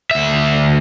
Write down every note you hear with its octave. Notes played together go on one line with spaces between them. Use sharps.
D2 E5